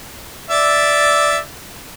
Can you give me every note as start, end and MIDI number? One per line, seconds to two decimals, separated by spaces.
0.50 1.38 74
0.50 1.38 76